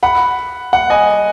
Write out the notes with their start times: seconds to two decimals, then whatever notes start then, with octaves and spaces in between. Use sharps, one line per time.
0.03 F#5 B5
0.73 F#5
0.90 D#5 G#5